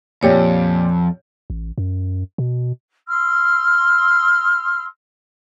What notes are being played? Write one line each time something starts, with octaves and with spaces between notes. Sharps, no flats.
F2 A#2 G4 C#5 D5
A1
F#2
B2
C6 E6 F6